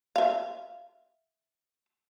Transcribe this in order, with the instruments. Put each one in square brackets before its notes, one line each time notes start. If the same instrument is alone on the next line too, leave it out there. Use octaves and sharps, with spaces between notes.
[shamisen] E5 F5